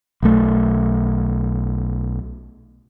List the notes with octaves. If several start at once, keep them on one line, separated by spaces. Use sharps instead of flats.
B1 A3